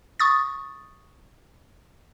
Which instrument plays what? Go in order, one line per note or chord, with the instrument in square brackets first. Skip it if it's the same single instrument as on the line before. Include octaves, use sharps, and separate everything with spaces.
[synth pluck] C#6 D#6 A6